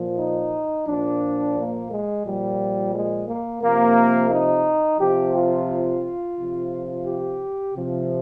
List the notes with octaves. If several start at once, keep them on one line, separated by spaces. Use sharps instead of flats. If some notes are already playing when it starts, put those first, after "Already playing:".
Already playing: A#2 F3
D#4
A#2 F3 D4
A#3
G#3
A#2 F3 G3
G#3
A#3
C3 F3 A#3
D#4
C3 F3 G4
F4
C3 F3
G4
C3 F3